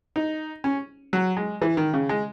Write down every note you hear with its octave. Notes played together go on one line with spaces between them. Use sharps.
D#4
C#4
F#3
G#3
E3
D#3
C#3
G#3